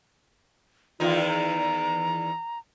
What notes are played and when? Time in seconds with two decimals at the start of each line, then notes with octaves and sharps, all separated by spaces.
1.00 E2 D#3 D#4 F4
1.28 A#5